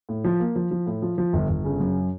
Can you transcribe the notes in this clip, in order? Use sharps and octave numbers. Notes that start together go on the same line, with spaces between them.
A2
F3
A#3
F3
F3
A2
F3
F3
G1
G1
C#3
F#2